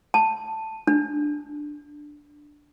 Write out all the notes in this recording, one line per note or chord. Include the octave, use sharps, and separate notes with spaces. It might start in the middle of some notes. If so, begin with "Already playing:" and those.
A5
D4